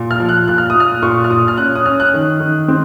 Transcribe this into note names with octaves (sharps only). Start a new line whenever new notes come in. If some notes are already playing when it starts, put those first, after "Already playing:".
Already playing: A#2
F6
F3
F#6
A#2 F#6
F6
D#6
A#2
F6
A#2 C#6
F6
A#2 D#6
F6
C#4 F#6
D#6
C#4 F6
F#6
D#3
D#3
C4